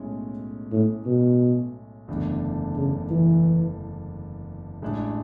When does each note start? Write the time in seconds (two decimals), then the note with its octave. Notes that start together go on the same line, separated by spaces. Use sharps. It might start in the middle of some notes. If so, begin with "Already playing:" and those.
Already playing: B1 A2 G#3 C#4
0.72 A2
1.06 B2
2.08 F#1 E2 D3 A3 D4
2.76 C#3
3.11 E3
4.82 A1 A2 G#3 D4